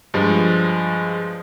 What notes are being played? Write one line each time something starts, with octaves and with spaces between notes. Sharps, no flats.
G2 F3 G#3